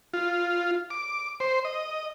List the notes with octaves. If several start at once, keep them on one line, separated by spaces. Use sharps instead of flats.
F4
D6
C5
D#5